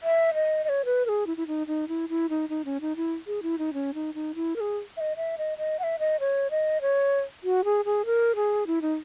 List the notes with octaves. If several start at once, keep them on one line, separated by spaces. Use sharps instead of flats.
E5
D#5
D#5
C#5
B4
A#4
G#4
E4
E4
D#4
D#4
E4
E4
D#4
D#4
C#4
D#4
E4
G#4
E4
D#4
C#4
D#4
D#4
E4
A#4
G#4
E5
D#5
E5
D#5
D#5
F#5
E5
D#5
C#5
D#5
C#5
F#4
G#4
G#4
A#4
G#4
E4
D#4